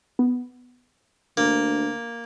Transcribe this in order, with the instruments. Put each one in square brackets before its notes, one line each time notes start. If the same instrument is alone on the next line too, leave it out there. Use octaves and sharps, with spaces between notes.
[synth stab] B3
[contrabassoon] D2 [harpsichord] A#3